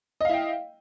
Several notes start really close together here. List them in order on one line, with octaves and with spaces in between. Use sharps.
D#5 F5 E4 G5